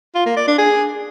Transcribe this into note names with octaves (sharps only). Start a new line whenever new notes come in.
F4
A#3
D5
D4
G#4